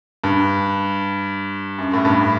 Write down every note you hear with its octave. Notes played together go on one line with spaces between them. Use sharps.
G2
F#2
A2
G2